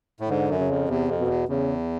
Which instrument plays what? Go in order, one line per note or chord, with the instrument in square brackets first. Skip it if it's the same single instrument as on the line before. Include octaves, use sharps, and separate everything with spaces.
[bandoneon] A2
[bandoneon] G#2 [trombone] D3
[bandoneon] F#2
[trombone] C#3
[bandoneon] F2
[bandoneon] E2 [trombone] C3
[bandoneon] F2
[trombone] B2
[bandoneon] E2
[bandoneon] E2 [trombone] C#3